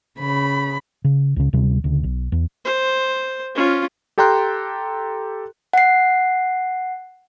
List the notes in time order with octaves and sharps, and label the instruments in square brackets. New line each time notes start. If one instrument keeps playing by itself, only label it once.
[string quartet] C#3 B5
[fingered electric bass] C#3
C#2 C#3
D2 C3 G3
D2 C#3
B1
E2
[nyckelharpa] C5
C#4 F4
[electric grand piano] G4 A4 G5 A#5 C6 F#6
[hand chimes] F#5 C7